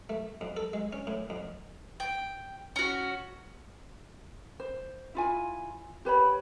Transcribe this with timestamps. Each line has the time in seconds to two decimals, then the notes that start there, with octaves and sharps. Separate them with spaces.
0.09 A3
0.41 F2
0.57 A4
0.73 G#3
0.93 C#4
1.07 A2
1.30 F2
2.00 G5
2.76 C#4 F#4
4.60 C5
5.15 E4 F4 G#5
6.05 G4 B4 C#5 B5